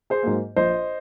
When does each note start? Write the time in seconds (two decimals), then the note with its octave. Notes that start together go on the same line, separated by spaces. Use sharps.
0.10 G#4 C5
0.23 G#2 F#3 A#3
0.56 A#1 C5 D#5